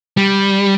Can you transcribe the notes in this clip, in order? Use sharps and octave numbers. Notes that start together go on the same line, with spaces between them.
G3